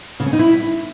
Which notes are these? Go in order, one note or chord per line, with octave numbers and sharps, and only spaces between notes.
C#3
C#4
D#4
E4